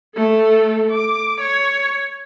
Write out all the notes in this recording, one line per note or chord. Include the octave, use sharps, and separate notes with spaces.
A3 A4
D6
C#5